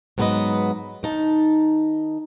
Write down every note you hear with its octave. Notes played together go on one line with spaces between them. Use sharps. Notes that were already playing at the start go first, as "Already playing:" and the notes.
G#2 F#3 B3 G4 B4 D#5
D#3 D#4 A5